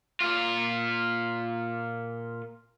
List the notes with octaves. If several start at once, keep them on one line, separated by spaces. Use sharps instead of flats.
A#2 F4